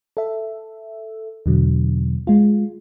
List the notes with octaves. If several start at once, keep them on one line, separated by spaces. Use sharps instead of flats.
A4 E5
E2 B2 D3 F#3
G#3 F4